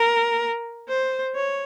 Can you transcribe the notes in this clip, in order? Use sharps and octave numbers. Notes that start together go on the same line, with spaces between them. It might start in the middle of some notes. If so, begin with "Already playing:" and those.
Already playing: A#4
C5
C#5